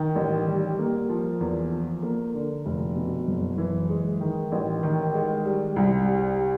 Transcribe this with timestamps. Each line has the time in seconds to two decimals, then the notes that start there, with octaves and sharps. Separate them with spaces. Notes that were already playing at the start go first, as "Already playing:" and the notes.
Already playing: D#3
0.16 A1
0.48 G3
0.79 A#3
1.09 F3
1.41 E2
1.72 F3
2.03 A#3
2.34 D3
2.66 F1
2.96 B2
3.27 F#1
3.58 E3
3.89 G#3
4.20 D#3
4.52 A1
4.83 D#3
5.14 G#3
5.45 G3
5.76 C2
6.07 G3